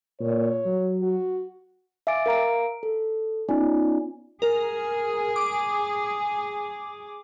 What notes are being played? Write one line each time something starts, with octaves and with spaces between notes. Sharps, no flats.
A#2 C#5
F#3
F#4
E5 F5 G#5 D6 A6 D7
A#4 F5 A#5 D7
A4
B3 C#4 D#4 F4 D5 G#5
G#4 A#4
D6